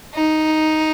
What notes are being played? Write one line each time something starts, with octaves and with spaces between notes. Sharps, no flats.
D#4